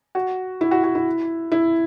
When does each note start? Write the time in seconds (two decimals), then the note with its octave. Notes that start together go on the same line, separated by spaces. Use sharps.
0.15 F#4
0.61 E4
0.71 F#4
0.84 F#4
0.95 E4
1.52 E4